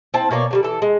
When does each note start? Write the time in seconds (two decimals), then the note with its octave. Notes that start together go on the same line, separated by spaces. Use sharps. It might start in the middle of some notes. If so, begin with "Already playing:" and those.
0.14 C4 E4 A5
0.31 B2 A#3 C#5 D5
0.51 D3 F#3 G3
0.63 E3 A4
0.82 G#3